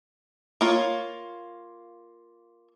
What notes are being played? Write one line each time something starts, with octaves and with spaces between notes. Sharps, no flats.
A#3 F4 C#5